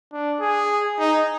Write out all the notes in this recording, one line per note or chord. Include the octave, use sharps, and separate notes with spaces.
D4
G#4
D#4